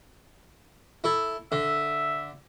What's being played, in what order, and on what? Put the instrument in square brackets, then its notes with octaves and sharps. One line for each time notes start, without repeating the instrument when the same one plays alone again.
[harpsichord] E4 A4
[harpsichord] D3 [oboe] E5